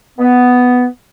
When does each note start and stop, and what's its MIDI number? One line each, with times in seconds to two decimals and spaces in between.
0.19 0.85 59